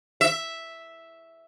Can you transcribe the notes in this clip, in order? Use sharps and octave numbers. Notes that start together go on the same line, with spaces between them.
E5